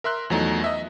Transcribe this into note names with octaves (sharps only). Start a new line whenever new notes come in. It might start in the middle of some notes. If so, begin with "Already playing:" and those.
A#4 E5 C6 F#6
E2 F3 F#3 A3 D#4
D#5 E5